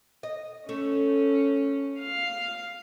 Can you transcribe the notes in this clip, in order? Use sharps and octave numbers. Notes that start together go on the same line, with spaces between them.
D#5
A3 C#4
F5